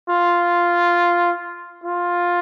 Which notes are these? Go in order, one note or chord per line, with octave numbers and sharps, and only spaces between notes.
F4
F4